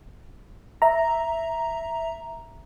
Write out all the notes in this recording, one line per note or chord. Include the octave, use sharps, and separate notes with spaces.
E5 A#5